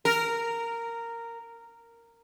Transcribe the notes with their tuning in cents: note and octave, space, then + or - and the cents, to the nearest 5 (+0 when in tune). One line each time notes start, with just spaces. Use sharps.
A#4 -10